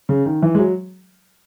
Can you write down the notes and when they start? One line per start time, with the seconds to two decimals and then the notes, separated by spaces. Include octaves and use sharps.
0.09 C#3
0.25 D#3
0.42 E3
0.55 G#3
0.59 F#3